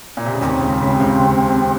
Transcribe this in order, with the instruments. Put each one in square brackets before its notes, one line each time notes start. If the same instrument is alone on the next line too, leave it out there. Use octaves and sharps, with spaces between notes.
[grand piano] A#2
C3
C#3
[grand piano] D#2 D#3 [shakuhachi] C#4
[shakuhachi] C4
[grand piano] C#2 C#3
C#2 C#3
C3
C#2 C#3